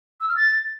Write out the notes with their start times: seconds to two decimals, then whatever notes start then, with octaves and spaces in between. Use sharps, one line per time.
0.21 E6
0.29 F6
0.37 A6